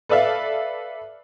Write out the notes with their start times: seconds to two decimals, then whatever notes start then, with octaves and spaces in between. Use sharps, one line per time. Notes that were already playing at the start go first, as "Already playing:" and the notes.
0.09 A4 B4 D5 E5 F5